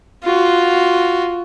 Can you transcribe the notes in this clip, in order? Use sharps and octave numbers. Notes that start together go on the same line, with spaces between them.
F4 F#4